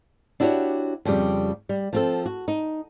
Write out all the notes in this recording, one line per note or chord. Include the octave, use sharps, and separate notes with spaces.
D4 E4 F#4 G4 B4 C#5
F2 C#3 G3 G4
G3
F3 C4 A4
F#4
D#4